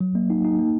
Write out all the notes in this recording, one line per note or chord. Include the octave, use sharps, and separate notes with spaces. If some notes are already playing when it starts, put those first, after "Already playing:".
F#3
A#3
D#4
D#4
A#3